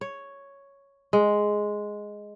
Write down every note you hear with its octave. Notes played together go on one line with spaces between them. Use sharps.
C#5
G#3